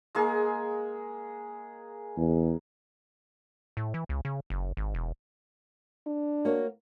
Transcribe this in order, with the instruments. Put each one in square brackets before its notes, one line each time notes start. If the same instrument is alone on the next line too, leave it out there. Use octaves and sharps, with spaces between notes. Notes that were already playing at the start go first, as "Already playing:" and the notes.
[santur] G#3 A#3 G#4
[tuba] E2
[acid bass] A2
E3
C#2
C#3
F#1
G#1
E1
[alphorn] D4
[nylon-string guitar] A#3 F#4 C#5